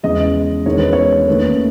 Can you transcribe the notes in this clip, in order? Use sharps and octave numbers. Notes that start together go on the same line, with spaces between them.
E2 C#3 G#3 D#5
E1 E2 D#3 G#3 C#4 C#5
B4
C#5
D#2 D#3 A3 C#4 B4